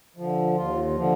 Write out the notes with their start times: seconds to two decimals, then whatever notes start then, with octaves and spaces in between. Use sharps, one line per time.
0.16 D3 F3
0.56 D#2 F4
0.96 D3 F3